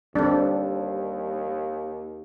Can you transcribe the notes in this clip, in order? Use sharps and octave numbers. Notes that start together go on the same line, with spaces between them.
D#2 G3 C4 D4 A4